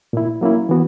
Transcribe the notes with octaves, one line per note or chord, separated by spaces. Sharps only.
A#2 A#3 E4
F#3 A#3 C#4 E4
E3 B3 F#4